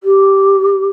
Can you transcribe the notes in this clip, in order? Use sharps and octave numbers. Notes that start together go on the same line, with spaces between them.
G4